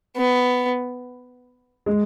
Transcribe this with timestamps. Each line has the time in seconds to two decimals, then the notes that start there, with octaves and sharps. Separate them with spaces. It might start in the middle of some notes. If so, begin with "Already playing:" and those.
0.17 B3
1.86 G#3